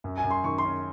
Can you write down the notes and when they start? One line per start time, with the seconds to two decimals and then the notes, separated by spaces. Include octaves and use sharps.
0.04 F#2
0.18 G#5
0.24 F#2
0.31 C6
0.44 D#3 C#6
0.58 C6
0.65 C#4